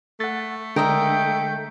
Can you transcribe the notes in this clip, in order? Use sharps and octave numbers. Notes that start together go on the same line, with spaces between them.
A3 F#5 A6
D3 G#3 A#4 D#5 E5 G5